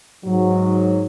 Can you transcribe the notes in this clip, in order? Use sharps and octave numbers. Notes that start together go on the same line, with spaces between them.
G#2 F#3